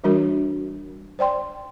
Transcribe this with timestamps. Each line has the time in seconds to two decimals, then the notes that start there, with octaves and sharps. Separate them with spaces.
0.04 E3 G3 D4 F#4 A#4
1.19 C5 D5 G5 C6